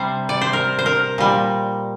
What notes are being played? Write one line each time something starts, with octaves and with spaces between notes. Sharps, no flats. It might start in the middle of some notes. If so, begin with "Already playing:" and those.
Already playing: C3 G3 C5
D5
C5
A#4
C5
A#4
A#2 G3